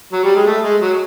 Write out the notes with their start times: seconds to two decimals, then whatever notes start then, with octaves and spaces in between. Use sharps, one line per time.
0.13 F#3
0.24 G3
0.35 G#3
0.47 A3
0.63 G#3
0.81 F#3